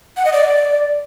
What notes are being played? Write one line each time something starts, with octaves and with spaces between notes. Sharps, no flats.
F#5
D#5
D5